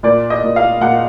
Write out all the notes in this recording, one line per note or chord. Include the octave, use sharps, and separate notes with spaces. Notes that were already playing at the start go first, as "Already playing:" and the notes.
A#2 D5
D#5
A#2
F5
A#2 F#5